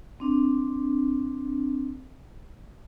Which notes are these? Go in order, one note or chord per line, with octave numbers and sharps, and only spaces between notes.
C4 D4